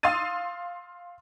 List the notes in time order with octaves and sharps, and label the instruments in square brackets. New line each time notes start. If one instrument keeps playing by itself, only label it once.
[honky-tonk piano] F5 C6 D#6 E6 A6 D#7